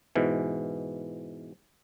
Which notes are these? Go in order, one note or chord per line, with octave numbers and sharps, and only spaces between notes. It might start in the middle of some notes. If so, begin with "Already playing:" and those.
G#2 B2 E3